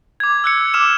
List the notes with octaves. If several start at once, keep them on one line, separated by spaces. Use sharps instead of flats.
D6 G#6
E6 F#6 C#7
D6 F6 E7